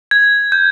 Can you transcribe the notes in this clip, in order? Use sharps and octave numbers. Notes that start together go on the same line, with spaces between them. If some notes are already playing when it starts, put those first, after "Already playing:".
G#6
G6